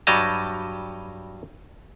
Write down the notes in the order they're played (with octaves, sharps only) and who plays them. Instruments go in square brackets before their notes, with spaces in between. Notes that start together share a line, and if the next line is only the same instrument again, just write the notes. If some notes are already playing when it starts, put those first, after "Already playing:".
[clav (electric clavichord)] G2 F#3 G3 D#5 A5 A#5